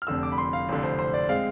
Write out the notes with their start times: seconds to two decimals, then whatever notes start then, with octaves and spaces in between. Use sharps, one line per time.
0.02 F6
0.07 F1 F2 D3 E6
0.23 D6
0.32 B5
0.38 C6
0.53 F5
0.68 F1 F2 D3
0.83 C5
0.99 C5
1.14 D5
1.29 G#3 C4 F5